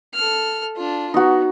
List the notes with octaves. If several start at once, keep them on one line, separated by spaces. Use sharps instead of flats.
A4 F6
D4 F4
B3 D#4 F#4